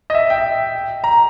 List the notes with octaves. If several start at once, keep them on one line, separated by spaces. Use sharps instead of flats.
D#5
E5
G5
A#5